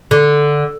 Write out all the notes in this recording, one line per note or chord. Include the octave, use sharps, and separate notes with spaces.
D3